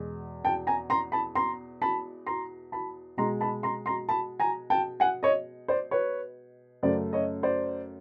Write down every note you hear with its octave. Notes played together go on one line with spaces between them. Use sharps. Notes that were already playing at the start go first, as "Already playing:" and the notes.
Already playing: E2 B2 G#3
G5 A5
G#5 A#5
A#5 C6
A5 B5
A#5 C6
A5 B5
A#5 C6
A5 B5
B2 G#3 A#5 C6
A5 B5
A#5 C6
A#5 C6
A5 B5
G#5 A#5
G5 A5
F#5 G#5
C#5 D#5
C5 D5
B4 C#5
F#2 C#3 F#3 A3 C5 D5
C#5 D#5
C5 D5